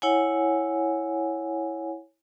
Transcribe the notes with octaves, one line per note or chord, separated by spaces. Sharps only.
E4 C#5 F#5 G#5